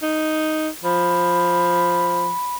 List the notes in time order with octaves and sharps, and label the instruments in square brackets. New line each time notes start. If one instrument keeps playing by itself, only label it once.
[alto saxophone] D#4
[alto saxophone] F3 [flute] B5